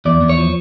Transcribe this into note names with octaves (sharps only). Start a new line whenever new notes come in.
E2 D5
E2
C#5
F3